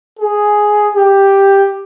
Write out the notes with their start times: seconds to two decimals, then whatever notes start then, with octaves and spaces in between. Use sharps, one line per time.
0.19 G#4
0.95 G4